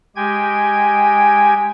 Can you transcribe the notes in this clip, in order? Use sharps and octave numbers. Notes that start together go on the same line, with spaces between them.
G#3 G4 G5 G#5 G#6